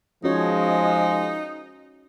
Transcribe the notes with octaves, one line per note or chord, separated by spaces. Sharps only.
F3 G#3 C#4 D#4 F#4 C#5